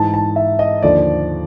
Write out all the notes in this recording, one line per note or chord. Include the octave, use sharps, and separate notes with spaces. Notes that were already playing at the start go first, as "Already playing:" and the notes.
Already playing: G#2 E3 A5
A5
E5
D#5
D#2 D3 F3 D5